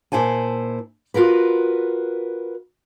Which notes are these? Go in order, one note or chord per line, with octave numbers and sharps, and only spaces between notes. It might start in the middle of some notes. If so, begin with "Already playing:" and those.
A#2 E4 C5 G#5 A5
F4 F#4 A#4 B4